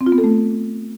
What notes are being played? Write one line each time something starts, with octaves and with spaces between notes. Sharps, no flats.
C4
F4
B3
A4
A3